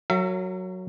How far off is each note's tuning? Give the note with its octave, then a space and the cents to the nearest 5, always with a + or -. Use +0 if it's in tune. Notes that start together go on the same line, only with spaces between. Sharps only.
F#3 +0 A#4 -35 E5 +40